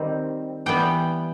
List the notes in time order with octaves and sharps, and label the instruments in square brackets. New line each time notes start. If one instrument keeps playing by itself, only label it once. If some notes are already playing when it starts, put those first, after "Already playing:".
Already playing: [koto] D#3 G3 C4
E3 G3 B3 G5